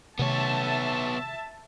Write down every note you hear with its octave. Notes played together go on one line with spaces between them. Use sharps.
C3 D#3 A3 B3 C#5 E5 A5